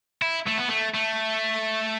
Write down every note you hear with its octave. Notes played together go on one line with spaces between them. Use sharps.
E4
A3
B3
A3
A3